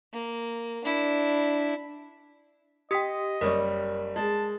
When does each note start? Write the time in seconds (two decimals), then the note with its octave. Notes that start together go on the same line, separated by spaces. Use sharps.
0.14 A#3
0.84 D4 E4
2.91 G4 D#5 G5 D#6 B6
3.41 F#1 G3 A#4 C#5
4.16 G#3 A5